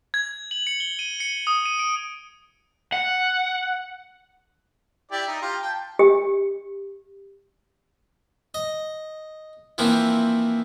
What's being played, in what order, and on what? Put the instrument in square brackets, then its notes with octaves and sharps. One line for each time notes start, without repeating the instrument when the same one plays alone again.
[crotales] G#6
F#7
C#7
G7
D#7
C#7
D#6
D#7
D7
[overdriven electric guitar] F#5
[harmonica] E4 G4 D5
D#4
F4 G4 A#5
G5 A5
[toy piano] G4
[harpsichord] D#5
E3 F3 A#3 C4 E4